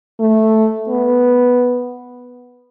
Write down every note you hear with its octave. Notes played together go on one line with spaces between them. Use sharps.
A3
B3